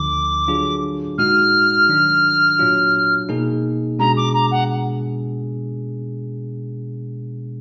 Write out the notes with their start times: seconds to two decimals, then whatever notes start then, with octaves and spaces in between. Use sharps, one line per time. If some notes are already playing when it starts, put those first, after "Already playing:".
Already playing: D2 D3 F3 D6
0.48 D3 F#3 D4 F4 G#4
1.18 A#2 G#3 D#4 F#4 F6
1.89 D#3 F#3 D4
2.59 A#2 F#3 D4 F4
3.29 B2 A#3 D#4 G#4
3.99 B2 G#3 B3 D4 G#4 A#5
4.17 D6
4.34 A#5
4.51 F#5